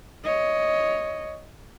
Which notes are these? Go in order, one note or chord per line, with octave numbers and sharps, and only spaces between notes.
C#5 D#5